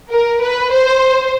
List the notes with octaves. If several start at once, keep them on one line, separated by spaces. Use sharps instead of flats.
A#4
B4
C5